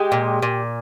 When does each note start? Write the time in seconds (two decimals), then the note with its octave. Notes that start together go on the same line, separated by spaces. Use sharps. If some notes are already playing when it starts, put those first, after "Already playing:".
Already playing: G#3 G4
0.12 A#2
0.42 A#2